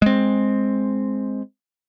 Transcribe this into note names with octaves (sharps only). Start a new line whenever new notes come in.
G#3 C4